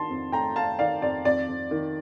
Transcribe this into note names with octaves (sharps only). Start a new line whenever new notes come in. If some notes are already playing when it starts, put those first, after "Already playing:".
Already playing: D#3 D4 A5 C6
F2
A3 G5 A#5
A3 F5 A5
D#3 D5 F5
F2 D5
F2 D5
F2
D#3